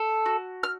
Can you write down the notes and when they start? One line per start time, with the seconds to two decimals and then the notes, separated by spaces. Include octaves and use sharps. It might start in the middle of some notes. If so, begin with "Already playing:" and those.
Already playing: A4
0.26 F#4
0.63 F6